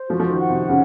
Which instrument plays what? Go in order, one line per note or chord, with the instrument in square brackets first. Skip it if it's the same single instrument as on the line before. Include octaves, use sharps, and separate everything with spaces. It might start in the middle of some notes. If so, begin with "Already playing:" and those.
Already playing: [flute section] C5
[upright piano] F3 [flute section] F#4
[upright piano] F3
D#3
[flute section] F#5
[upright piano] C3
[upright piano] C#3 [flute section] C#4